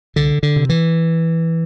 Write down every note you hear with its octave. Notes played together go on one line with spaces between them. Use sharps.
C2 D3
D3
C3
E3